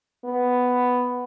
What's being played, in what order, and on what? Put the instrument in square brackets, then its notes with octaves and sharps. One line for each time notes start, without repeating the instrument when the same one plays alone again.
[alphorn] B3